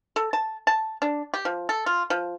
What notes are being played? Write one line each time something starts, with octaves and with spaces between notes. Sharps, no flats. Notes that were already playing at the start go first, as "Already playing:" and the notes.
A4
A5
A5
D4
G4
F3
A4
F4
F3